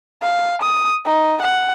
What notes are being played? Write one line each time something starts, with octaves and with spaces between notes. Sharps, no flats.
F5
D#6
D#4
F#5